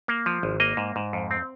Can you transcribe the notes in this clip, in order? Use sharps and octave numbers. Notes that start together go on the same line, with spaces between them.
A#3
F3
G#1
A#3 D#5
G#2
G#2
F2
C4